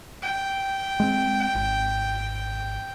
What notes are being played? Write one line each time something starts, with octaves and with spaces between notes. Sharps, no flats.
G5
G#3 A3 C4
G#1